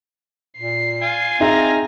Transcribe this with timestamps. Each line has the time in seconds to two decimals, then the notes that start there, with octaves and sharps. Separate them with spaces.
0.58 A#2 C7
1.02 F4 G#5
1.40 C4 D#4 G#4 E5 A#5 A#6